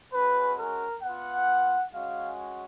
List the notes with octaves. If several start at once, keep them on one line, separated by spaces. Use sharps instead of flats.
G#3 C#4 F#4 B4
A#4
B3 F4 F#5
G#3 C#4 F#4 F5